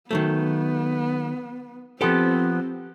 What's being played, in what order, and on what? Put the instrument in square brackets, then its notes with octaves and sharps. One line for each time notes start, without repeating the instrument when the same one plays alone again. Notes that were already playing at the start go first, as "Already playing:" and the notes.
[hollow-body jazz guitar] D#3 F#3 A3 [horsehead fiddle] B3
[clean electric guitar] F3 B3 [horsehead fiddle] C4 [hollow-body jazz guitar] G4 A4